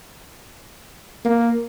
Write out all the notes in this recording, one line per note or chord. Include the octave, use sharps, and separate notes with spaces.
A#3